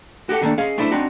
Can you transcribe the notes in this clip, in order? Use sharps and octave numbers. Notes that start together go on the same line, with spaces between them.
F#4 G4 A4 F#5
D3 D#3 A3 A#3 D4
C#4 G#4 D#5 F5
A3 D4 E4 C5
C4 D4 D#4 F#4